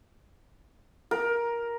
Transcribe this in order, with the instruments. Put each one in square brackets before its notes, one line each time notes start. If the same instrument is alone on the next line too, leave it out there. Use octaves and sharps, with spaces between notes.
[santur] A#4